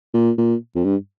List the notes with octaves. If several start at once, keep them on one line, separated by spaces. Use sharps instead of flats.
A#2
A#2
F2
G2